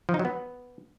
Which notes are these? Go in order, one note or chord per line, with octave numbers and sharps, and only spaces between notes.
F3
D#4
F#3
B3